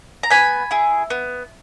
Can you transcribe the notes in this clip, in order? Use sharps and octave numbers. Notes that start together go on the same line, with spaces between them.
A#5
B3 G#5 B5
E4 G#4
B3